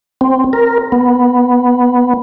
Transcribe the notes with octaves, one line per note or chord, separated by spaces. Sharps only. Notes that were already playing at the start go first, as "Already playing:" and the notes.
C4
A#4
B3